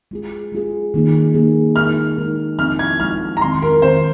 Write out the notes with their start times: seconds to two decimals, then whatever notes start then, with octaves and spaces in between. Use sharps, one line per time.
0.11 G#3 F4 G#4
0.52 G#3 F4 G#4
0.94 D#3 A#3 D#4 G#4
1.35 D#3 A#3 D#4 G#4
1.76 G#3 D#4 A#4 F6
2.17 G#3 D#4 A#4
2.59 F3 G#3 C4 D#4 F6
2.79 G#6
3.00 F3 G#3 C4 D#4 F6
3.37 A#5
3.41 D#3 G#3 C4 C6
3.62 A#4
3.82 D#3 G#3 C4 C5